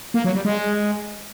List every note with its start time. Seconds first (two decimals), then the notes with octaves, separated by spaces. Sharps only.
0.14 A#3
0.24 F#3
0.35 G3
0.45 G#3